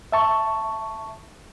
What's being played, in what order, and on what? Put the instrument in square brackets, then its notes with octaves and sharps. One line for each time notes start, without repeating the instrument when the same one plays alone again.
[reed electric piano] E5 A5 C#6